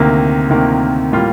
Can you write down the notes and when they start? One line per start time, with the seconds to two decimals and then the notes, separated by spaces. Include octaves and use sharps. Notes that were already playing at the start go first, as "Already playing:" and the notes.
Already playing: D2 C3 D#3 A#3
0.49 D2 C3 D#3 A#3
1.12 A2 G3 A#3 F4